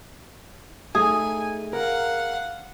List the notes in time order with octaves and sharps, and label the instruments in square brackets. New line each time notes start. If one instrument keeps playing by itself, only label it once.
[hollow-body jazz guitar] A3 D#4 [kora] G#4 [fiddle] G#5
[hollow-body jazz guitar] A#4 [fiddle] F5 F#5